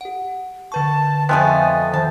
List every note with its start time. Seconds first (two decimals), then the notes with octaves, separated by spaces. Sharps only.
0.01 G4 F#5
0.72 D3 B4 A5 C#6
1.29 F2 F3 G#3 A3 B3 C4 G#5
1.94 D#3 C5 A5